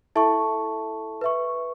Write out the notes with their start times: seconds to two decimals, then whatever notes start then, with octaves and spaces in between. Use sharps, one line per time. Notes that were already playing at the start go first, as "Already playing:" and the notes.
0.16 E4 A4 E5 A5 C#6
1.21 B4 E5 C#6